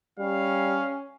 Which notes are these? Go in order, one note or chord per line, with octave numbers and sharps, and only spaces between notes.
G3 C#4 F5